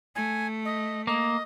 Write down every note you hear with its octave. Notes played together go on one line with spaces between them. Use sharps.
A3 G#5
D#5
A#3 D#5